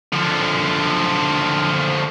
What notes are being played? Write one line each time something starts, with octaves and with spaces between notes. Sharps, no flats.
D3 F3